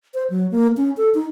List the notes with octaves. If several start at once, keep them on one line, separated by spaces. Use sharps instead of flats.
C5
F#3
A#3
C#4
A4
D#4